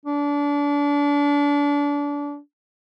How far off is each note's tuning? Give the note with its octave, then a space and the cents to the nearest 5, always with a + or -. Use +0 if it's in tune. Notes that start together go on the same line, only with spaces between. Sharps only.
D4 -30